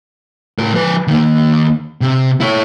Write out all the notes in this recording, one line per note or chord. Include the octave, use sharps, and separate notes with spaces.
A2 A#4
F3 B4
D#3 A#3
C3
E4 C#5